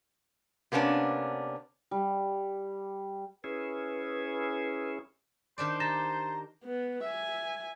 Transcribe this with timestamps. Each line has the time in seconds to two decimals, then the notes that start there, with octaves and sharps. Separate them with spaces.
0.72 C3 A#3 B3 C#4 D4
1.91 G3
3.44 C#4 E4 G#4 B4
5.58 D#3 D4 C5 D5
5.80 G4 A#5 A6 A#6 E7
6.64 B3
7.04 E5 G#5